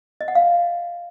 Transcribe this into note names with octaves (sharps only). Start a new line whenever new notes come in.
D#5
F#5
F5